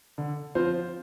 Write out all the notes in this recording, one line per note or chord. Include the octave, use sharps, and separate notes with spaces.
D3
F3 C4 F4 C5